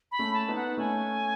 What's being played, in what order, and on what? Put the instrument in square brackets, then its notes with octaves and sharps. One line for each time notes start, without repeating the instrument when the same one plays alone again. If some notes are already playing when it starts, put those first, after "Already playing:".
[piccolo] B5
[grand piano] A3 C#4
[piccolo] A5
[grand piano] B3 D#4
[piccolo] F#5
[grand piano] A3 C#4 [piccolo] G#5